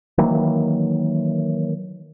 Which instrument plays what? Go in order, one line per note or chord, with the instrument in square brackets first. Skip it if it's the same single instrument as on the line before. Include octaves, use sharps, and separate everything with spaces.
[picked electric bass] D#3 E3 F#3 A#3